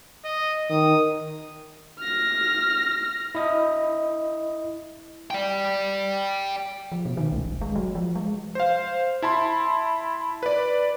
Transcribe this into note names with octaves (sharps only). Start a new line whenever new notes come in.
D#5
D#3 D#6
F6 A#6
E4 D#5
D5 G5
F3
B2
D#3
C2
F#1
G#3
F#3
F3
G#3
C5 F5
E4 A5 B5 C6
B4 D5